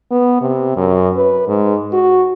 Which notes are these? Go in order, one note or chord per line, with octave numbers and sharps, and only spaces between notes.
B3
C3
F#2
B4
G#2
F#4